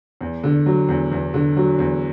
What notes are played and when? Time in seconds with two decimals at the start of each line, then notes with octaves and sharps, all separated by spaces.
0.21 E2
0.44 D3
0.66 F#3
0.89 E2
1.11 E2
1.34 D3
1.57 F#3
1.79 E2